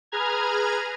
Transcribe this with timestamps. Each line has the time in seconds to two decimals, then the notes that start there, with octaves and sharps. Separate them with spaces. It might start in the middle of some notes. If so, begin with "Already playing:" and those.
0.12 G#4 B4 A#5 F6 G#6